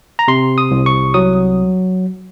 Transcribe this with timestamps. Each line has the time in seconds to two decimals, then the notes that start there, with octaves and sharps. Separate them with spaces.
0.19 A#5
0.28 C3 C6
0.58 D#6
0.71 C2
0.86 C#6
1.14 F#3 D#6